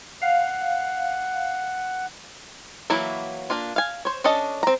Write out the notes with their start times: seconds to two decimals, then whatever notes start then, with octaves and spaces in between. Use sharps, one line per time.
0.22 F5 F#5
2.90 E3 F#3 A#3 E4
3.50 A#3 D4 F4
3.76 F5 G#5
4.05 C5 C#5
4.24 C#4 D4 A4 D#5 A5
4.63 C4 A#5